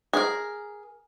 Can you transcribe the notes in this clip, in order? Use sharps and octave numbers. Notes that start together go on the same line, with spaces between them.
G#4 A#4